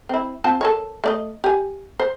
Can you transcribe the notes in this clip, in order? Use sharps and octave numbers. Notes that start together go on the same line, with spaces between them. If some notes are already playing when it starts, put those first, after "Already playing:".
C4 E4
C4 F4 A5
A4 A#4 C#5
A3 D5 D#5
G4 G#5
C5